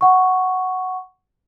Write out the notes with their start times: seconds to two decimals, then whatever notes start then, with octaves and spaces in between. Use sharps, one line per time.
0.01 F#5 C#6